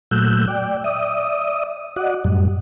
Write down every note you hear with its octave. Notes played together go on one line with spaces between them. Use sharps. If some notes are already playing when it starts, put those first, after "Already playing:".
A#2 F#3 A3 E6 F#6 G6
D5 G5
D5 E5 D#6
F#4 D5 D#5 F#5
F#2 A2 G3